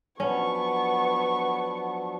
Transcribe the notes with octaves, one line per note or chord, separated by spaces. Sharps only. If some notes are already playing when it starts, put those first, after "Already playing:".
F3 F#3 B3 C#4 D4 C#6